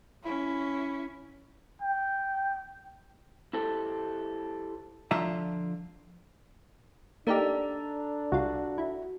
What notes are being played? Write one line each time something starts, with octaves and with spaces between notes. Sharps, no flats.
C#4 E4
G5
E4 G4 A4 C5
D3 F3 F4 E5 A#5
A#3 D4 D#4 G4 A4 D5 A#5
C2 F4 F#4
E4